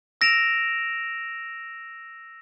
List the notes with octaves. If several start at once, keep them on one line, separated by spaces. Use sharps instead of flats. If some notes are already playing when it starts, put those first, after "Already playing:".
E6 A#6 D7 E7 F7